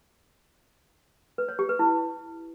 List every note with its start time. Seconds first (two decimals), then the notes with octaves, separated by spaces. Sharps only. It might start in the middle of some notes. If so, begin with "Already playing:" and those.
1.38 B4
1.49 C#5
1.59 G4
1.69 B4
1.79 E4